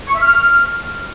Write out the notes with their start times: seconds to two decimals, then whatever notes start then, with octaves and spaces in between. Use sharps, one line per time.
0.08 C#6
0.14 E5
0.21 F6